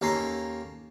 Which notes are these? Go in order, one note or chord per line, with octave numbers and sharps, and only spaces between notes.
D#2 C#4 A4 G#5 A#5 C6